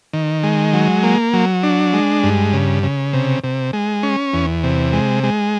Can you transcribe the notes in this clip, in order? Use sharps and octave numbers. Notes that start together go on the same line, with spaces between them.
D#3
G#3
F#3
A#3
F#3
D4
G#3
G2
C#3
C#3
C3
C3
G#3
C#4
E2
C3
G#3
G#3